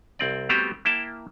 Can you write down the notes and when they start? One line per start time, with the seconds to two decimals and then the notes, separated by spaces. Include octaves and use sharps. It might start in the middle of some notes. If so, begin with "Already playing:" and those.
0.19 C2 C4 D5
0.49 G3 A3 B3 C4 F#4 G4
0.85 A#3 E4 G5 A5